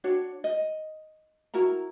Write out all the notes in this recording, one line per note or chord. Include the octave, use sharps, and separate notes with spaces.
D4 F#4 C#5
D#5
E4 F#4 A#4 A#5